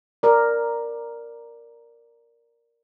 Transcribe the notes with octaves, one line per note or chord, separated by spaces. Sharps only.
A#4 D5